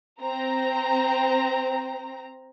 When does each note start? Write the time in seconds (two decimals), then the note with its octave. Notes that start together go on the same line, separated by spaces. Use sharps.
0.20 C4 A#5